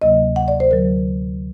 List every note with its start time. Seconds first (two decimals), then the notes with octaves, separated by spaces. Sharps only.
0.02 D2 C3 F#3 A#3 D#5
0.36 F#5
0.48 D5
0.60 C5
0.71 D2 D3 F#3 A#4